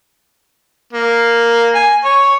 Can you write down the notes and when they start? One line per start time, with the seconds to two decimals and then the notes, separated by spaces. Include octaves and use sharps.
0.93 A#3
1.75 G#5
2.05 C#5